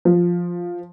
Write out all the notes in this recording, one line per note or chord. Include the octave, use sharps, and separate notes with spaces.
F3